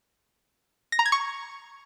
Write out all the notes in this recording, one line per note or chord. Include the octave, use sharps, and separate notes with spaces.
A#6
A#5
G#6
C#6